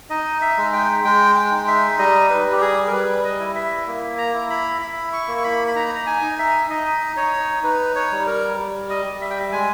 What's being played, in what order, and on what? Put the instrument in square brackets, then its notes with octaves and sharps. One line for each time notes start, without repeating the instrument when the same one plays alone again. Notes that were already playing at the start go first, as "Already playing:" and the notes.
[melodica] D#4 D#5
E5
G#3
G5
G#3 G5
G5
D#4
E5
G3 D#5
B4
G3
G4
G#4
A#4
G3 B4
D#5
E4
E5
A#3
A#5
E4
B5
E4 B5
C#6
A#3
C#6
B5
B5
D#4 A#5
A#5
G#5
D#4
E5
D#4 D#5
D#4 C#5
D#4 B4
C#5
G3
A#4
G3
D#5
G3
E5
G5
E5
G#3 G#5